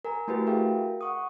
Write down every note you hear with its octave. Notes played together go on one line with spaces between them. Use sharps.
A#4 G#5 A#5
A3 E4 F#4 G4 A#4 B4
F#4 G#4 A#4 E5 F5 G5
F#5 C#6 D#6